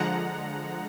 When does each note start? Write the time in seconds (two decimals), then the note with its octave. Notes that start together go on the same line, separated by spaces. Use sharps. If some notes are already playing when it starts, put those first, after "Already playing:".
Already playing: D3 F3 G#3 F#5 A#5